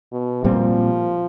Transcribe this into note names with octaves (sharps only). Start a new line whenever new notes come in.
B2
A#2 F3 G3 C4